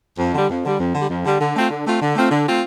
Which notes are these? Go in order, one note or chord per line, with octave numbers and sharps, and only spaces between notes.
F2
D3 G3
F2
D3 G3
F2
D3 G3
F2
D3 G3
D3
A3 C4 F4
D3
A3 C4 F4
D3
A3 C4 F4
D3
A3 C4 F4